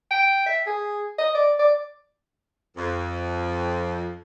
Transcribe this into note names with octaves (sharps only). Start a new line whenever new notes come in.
G5
E5
G#4
D#5
D5
D5
F2